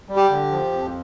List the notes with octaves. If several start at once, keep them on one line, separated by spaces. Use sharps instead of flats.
G3
G4
D3
F3
F2